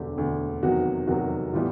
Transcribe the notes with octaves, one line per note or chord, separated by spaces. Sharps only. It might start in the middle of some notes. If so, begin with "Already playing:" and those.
Already playing: E1 D2 D3 G4
E1 D2 D3
F1 E2 C3 D#3 F#3 F#4
F1 E2 C3 D#3 F#3 F#4
A2 E3 G3 B3 F4